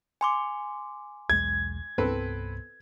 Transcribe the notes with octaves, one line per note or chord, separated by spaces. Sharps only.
G#5 C6 D6
B1 E2 G#3 G#6
C2 G2 B3 C4 A4 B4